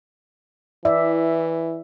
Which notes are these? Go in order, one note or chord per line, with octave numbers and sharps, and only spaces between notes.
E3 E4 D5 E5